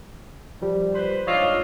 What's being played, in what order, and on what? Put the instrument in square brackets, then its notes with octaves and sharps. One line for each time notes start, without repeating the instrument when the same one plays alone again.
[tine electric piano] F3 G3
[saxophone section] B4 C5
[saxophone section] G#2 D4 F4 [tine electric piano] C#5 D#5 E6